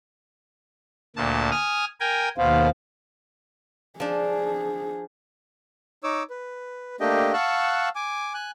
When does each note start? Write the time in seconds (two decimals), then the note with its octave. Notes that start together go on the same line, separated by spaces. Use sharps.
1.16 D2 A#2 A5
1.51 G#5 D#6 F6
2.00 A#4 G5 G#5
2.38 D#2 B2 C5 F5
4.00 F3 D4 G#4
6.04 D#4 C#5 D6 E6
6.30 B4
7.00 A3 A#3 D4 G4 D#5 G5
7.33 F5 F#5 A5 C#6 E6 F#6
7.95 G#5 D6
8.34 G#5 F#6